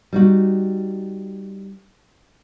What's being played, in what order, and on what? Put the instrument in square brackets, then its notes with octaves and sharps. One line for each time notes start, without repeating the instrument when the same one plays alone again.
[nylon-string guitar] G3 D#4 F#4